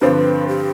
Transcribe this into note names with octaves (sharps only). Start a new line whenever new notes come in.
G2 D3 F3 C4 B4
G4